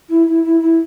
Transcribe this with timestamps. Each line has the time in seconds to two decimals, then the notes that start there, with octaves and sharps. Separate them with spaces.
0.09 E4
0.27 E4
0.44 E4
0.60 E4